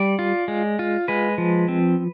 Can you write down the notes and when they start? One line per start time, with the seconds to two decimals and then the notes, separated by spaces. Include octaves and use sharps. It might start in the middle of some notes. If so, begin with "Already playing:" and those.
Already playing: G3 D5
0.19 F4
0.48 G#3
0.79 F4
1.08 G#3 B4
1.38 F3
1.68 C4